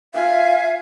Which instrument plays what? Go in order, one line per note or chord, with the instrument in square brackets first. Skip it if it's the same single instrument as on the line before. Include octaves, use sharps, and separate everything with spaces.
[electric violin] F4 G#5 [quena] E5 [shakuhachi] F5